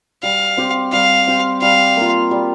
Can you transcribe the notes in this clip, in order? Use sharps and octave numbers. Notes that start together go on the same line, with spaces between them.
G3 F5
C4 G4
G3 F5
C4 G4
G3 F5
A#3 F4
G3